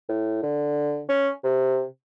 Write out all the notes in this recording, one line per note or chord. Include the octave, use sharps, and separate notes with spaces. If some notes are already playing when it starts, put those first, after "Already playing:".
A2
D3
C#4
C3